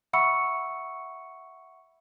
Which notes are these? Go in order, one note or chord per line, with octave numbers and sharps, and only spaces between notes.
E5 F#5 B5 C#6 E6 C#7